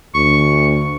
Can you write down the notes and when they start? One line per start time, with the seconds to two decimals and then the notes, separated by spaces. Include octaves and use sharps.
0.14 D2 C#6